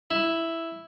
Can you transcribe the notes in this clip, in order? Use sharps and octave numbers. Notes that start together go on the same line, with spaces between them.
E4